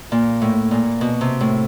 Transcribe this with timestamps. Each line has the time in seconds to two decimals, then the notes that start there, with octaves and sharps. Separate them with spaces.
0.12 A#2
0.42 A2
0.71 A#2
1.01 B2
1.21 C3
1.41 A2